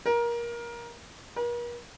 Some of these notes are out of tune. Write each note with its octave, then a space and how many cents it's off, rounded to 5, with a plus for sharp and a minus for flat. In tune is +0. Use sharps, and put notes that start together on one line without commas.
A#4 +20
A#4 +45